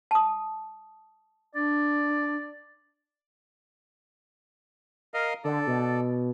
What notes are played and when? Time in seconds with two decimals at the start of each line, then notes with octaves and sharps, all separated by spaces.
0.11 A5 D#6
1.55 D4 D5
5.14 A#4 D#5 F5
5.44 D3 A4 D5
5.67 B2